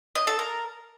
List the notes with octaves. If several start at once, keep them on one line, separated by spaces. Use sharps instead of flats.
D#5
A4
A#4